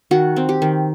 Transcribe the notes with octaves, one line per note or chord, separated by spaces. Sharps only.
D#3 F#4
C4
G4
D#3